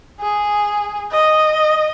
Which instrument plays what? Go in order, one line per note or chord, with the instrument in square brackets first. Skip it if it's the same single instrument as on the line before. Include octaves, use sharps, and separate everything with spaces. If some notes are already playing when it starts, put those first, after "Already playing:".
[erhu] G#4
D#5